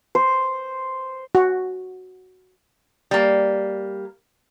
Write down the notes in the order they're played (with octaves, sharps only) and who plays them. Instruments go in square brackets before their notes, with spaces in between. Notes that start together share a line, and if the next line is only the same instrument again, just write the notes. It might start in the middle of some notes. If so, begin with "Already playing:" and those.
[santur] C5
[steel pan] F#4
[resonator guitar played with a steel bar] G3 A#3